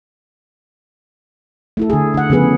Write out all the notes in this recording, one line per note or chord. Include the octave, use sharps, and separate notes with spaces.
A3 E4 A4
D3 G#4
D3 F#5
C#3 F3 B3 G#4 B4